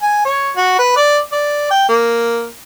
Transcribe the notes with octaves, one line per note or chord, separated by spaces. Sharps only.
G#5
C#5
F#4
B4
D5
D5
G5
A#3